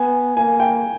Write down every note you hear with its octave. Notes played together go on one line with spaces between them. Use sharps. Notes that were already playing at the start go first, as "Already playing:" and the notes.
Already playing: B3 G#5
A#3 G#5
G5